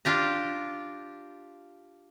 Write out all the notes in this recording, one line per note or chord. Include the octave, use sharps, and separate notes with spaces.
D4 F4 G4 A#5